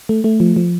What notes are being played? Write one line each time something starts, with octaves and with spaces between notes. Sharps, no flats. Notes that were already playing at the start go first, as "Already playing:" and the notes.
A3
A3
F3
F3